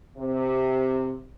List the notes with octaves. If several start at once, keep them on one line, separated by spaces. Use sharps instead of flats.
C3